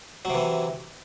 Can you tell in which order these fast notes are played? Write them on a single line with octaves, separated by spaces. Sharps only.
F#3 C3 E3